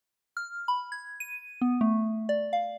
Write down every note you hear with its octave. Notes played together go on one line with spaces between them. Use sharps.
F6
B5
G#6
D#7
B3
A3
D5
F5